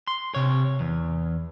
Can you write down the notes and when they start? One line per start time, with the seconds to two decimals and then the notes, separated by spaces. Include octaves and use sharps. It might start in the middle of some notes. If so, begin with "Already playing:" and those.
0.07 C6
0.35 C3 C#5
0.80 E2